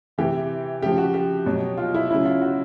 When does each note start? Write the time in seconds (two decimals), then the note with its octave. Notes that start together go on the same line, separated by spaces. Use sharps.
0.18 C3 E3 G4
0.81 C#3 F3 G4
0.98 F#4
1.14 G4
1.46 B2 F#3
1.78 F4
1.94 E4
2.10 C#3 F#3 E4
2.25 F4
2.42 F#4